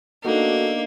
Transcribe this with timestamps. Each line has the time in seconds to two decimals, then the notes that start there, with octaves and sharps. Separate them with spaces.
0.25 A#3 B3 D4 D#4 F#4 A4